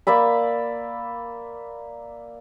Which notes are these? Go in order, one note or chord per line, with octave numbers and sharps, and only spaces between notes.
A#3 D5 E5 B5